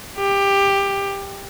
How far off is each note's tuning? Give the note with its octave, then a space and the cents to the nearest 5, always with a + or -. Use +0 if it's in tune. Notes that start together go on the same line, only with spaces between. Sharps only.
G4 +15